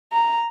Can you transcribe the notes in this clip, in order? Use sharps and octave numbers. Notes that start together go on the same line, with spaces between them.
A#5